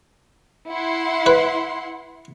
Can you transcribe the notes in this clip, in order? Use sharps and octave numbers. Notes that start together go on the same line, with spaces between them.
E4 F#5 C6
B4